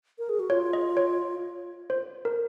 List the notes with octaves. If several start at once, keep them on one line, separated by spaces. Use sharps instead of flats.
A#4
G#4
F#4
F4 C#5
D#5
C#5
C5
A#4